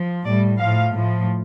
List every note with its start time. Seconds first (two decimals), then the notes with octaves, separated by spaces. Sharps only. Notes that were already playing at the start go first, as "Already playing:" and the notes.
Already playing: F3
0.25 A2 G3 D5
0.58 A2 F3 F5
0.91 A2 F3